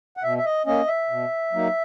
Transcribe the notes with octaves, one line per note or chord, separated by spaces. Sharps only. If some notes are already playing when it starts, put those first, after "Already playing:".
F#5
B2 E5
E5
D#5
A#3 C#4 D#5
E5
B2
F#3 A#3 D#4